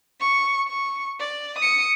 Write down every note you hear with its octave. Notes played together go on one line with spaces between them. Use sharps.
C#6
C#6
D5
D#6 C#7